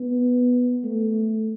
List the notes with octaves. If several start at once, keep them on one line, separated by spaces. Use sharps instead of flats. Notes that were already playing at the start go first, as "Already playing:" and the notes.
Already playing: B3
A3